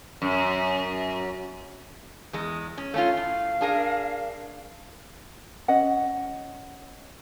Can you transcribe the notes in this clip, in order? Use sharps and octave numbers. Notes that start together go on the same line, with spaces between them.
F#2
E2 G#3
C#4
A3 C#4 F4 F5
A2
D4 G#4 A#4
C#4 D#5 F#5